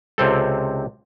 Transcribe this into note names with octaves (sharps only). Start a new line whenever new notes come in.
C#2 C3 C4 A4